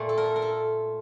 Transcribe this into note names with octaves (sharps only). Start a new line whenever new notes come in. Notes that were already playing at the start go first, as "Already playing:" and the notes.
Already playing: A#2 A3
A4
A#4
A4
A#4
A4